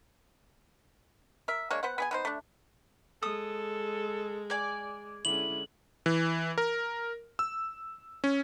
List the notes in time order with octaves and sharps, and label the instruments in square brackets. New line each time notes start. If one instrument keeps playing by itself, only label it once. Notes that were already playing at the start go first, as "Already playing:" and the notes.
[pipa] A#4 E5
G#3 A#3 D4 C#5
B3 C5 F#5
B3 G#4 G#5
B3 D#4 C5
A3 D4
[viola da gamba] G#3 [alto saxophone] A4 [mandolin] D#6
[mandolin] D5 G#5
[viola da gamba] D3 G#3 C#4 [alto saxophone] E4 [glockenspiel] F#7
[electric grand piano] E3
A#4
E6
C#4